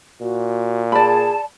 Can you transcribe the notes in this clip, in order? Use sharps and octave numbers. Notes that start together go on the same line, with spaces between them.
A#2 F#4
G#4 D5 A5 B5